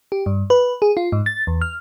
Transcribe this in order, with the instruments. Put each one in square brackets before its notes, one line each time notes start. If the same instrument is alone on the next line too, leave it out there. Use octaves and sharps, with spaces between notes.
[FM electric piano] G4
G2
B4
G#4
F4
G#2
A6
E2
F6